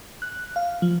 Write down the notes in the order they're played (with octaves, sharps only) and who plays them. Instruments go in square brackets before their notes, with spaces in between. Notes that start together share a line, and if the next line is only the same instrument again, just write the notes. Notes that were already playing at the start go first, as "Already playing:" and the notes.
[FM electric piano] F#6
F5
F3